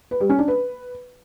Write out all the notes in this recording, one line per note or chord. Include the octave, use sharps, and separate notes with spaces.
B4
G3
C#4
D4
B4